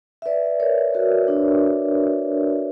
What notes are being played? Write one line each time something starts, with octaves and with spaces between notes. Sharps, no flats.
E5
B4 D5
A#4 C#5
F#4 A#4
D4